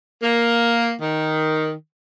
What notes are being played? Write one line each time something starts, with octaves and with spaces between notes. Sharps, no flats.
A#3
D#3